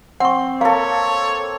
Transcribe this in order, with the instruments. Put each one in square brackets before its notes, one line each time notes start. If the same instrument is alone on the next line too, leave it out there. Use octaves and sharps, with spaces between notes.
[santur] C4 [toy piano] F#5 C#6
[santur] A#3 A4 [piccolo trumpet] C#5 [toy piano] F5